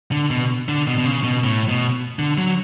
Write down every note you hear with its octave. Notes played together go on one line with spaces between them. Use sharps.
D3
B2
D3
B2
B2
C#3
B2
A2
B2
D3
F#3